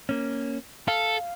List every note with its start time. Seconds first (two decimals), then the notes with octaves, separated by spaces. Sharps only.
0.09 A#3 C#4
0.88 A4 F5